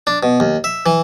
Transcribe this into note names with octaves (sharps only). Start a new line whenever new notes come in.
D4
B2
D#2
E5
E3